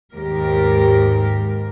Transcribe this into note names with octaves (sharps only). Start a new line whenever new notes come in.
D#2 G#2 G4 A#4